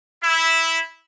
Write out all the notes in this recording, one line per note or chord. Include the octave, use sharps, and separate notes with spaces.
E4